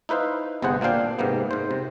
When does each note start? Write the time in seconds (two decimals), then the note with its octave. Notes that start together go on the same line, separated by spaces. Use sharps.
0.09 D#4 E4 B4 C5 F5
0.62 G1 C3 B3 G#4 C5 F#5
0.81 A#2 A#3 D4 F5 G5
1.19 G#2 C3 A#3 B3
1.51 G#2 C5
1.71 C3